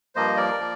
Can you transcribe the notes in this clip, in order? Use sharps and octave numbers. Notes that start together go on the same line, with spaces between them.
G2 F3 A#3 C5 D#5
A#4 D5
F3 A#3